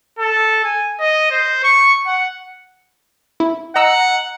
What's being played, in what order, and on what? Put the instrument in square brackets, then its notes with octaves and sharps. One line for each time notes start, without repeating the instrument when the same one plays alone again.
[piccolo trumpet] A4
G#5
D#5
C5
C#6
F#5
[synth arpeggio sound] E4
[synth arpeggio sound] D#5 A#5 E6 [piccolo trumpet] F#5